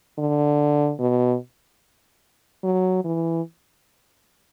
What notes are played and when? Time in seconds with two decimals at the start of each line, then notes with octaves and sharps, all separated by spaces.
0.18 D3
0.99 B2
2.63 F#3
3.05 E3